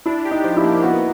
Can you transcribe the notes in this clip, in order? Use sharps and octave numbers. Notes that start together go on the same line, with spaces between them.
D4 E4
G4
D#4
F3
E4
A#3
B3 F#4